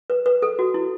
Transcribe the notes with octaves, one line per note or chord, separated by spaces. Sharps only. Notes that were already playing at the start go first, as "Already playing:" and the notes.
B4
B4
A4
F#4
E4